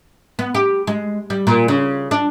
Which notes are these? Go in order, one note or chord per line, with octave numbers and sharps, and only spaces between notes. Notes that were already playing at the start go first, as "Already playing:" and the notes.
B3
G4
G#3
G3
A#2
C#3
D4